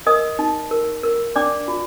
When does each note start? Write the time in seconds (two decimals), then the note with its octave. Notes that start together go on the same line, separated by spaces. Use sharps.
0.06 A#4 D#5 D#6
0.39 D#4
0.71 A#4
1.03 A#4
1.36 D4 D5 D6
1.68 F4